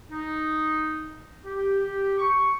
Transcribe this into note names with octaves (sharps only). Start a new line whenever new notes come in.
D#4
G4
C#6